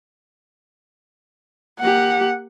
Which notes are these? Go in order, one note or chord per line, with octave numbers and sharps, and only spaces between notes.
A#3 G4 F#5